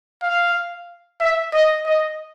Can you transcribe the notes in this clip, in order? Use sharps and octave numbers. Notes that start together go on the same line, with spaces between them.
F5
E5
D#5
D#5